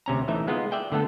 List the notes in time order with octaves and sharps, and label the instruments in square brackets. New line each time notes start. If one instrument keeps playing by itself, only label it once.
[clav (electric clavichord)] D2 C3 C#4 A#5
E3 A3 D#4 E5
G#3 B3 D#4 F4
D5 E5 G5 G#5
D3 A3 B3 A4